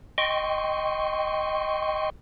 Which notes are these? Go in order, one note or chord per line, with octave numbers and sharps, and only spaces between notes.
D#5 G5 C6 C#6